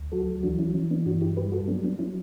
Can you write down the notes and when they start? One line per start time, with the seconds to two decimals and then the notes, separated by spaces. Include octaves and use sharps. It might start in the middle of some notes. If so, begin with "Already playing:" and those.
Already playing: D2
0.12 F#3 F#4 A4
0.43 E3 D4 F#4
0.59 C#4 E4
0.74 E3 C#4
0.90 B3 D4
1.06 G2 D4 F#4
1.21 E4 G4
1.37 G3 G4 B4
1.52 F#4 A4
1.68 F#3 B3 D4
1.84 B3 D4
1.99 F#3 C#4 E4